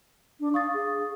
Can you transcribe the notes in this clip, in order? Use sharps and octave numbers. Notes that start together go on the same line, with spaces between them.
D4
F5 C#6 D#6 A6
G#4